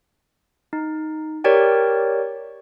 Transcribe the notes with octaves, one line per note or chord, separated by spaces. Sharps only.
D#4
G4 A#4 C#5 D5 G5